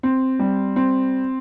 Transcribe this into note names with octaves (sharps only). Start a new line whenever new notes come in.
C4
G3
C4